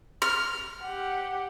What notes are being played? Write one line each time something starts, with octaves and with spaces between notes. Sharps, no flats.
F6
G4 F#5